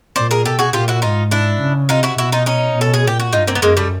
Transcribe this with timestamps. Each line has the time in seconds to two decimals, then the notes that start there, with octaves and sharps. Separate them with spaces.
0.16 A#2 C5 D5
0.31 G#4 A#4
0.45 B2 G4 A4
0.59 F#4 G#4
0.73 A#2 F4 G4
0.88 E4 F#4
1.02 G#2 D#4 F4
1.31 D4 E4
1.60 C#3
1.89 C3 D#4 F4
2.03 E4 F#4
2.18 B2 E4 F#4
2.32 D#4 F4
2.46 C#4 D#4
2.76 B2
2.81 A4
2.94 G#4
3.04 A#2 G4
3.20 F#4
3.33 G2 D#4 F4
3.47 A#3 C4
3.55 B3
3.62 F#2 G#3 A#3
3.77 G3 A3